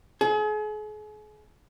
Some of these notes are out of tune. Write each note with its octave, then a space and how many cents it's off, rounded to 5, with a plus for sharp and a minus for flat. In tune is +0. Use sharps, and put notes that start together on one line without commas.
G#4 +40